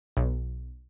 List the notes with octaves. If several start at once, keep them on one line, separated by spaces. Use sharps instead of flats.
B1